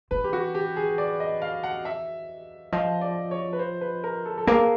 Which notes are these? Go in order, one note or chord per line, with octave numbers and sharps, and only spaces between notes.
E3 B4
G4
F#4
G4
G#4
D5
D#5
F5
F#5
E5
F3 D#5
D5
C#5
B4
C5
B4
A#4
A4
A4
A#3 G#4